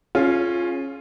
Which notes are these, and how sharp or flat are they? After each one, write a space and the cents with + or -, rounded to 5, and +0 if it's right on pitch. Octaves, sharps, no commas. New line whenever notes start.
C#4 -15 F4 +0 G#4 +30